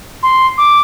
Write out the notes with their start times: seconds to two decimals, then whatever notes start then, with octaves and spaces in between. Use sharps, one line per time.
0.23 C6
0.58 D6